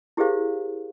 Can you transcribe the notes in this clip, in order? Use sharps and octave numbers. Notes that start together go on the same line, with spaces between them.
E4 G4 G#4 A#4 C5 F5